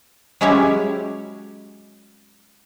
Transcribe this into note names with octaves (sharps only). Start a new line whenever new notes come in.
F#3 G#3 C#4 E4 G4 C#5